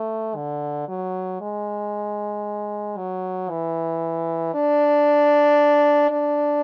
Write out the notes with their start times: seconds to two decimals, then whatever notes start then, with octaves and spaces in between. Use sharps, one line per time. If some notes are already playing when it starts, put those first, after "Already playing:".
Already playing: A3
0.36 D3
0.88 F#3
1.41 G#3
2.97 F#3
3.50 E3
4.54 D4
6.11 D4